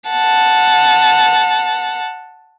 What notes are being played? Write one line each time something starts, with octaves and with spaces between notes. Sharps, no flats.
F#5 A5